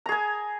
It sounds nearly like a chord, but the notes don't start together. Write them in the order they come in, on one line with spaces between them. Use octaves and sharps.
A#5 G#4 G#5